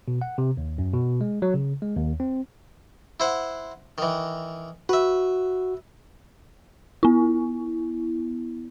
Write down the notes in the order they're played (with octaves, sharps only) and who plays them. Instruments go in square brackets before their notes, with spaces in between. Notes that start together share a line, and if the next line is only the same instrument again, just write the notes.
[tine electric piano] B2
F#5
C3
D#2
F#2
B2
G#3
F#3
C#3
G#3
D#2
C4
[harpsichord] E4 C5 F#5
D#3 E3
[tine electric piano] F#4 [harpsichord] B4 E5
[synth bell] B3 E4